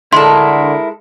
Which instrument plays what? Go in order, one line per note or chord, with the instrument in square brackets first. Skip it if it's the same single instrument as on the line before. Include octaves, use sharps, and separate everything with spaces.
[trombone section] D3 [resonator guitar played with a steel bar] G#3 A4 [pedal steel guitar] E4 A#4 [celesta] C6